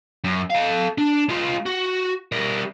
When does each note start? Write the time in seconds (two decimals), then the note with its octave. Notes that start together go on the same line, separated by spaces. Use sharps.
0.24 F#2
0.50 A4 F5
0.98 D4
1.29 G#3 F4
1.66 F#4
2.32 G3 A#4